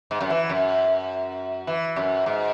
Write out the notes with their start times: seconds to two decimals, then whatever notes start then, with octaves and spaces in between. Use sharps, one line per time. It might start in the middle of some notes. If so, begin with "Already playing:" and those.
0.11 G#2
0.21 F#2
0.30 E3
0.50 F#2
1.67 E3
1.96 F#2
2.26 G#2